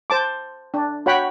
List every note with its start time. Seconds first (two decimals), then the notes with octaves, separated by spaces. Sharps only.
0.10 C5 A5 D6
0.74 D4
1.06 F#4 C#5 F#5 G5 B5